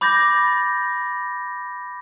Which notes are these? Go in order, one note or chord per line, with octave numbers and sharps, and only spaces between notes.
B5 D6 G6 A6 A#6